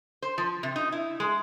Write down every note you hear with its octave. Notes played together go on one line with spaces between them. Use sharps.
C5
F3
C3
D#4
E4
G#3